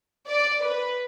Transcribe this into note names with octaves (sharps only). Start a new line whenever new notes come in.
D5
B4